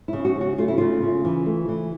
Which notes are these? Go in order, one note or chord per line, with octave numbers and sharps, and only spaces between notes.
C#3 E4
F#4
C#4
F#4
A3 F4
E4
C#3 F4
C#3
E3
A3
E3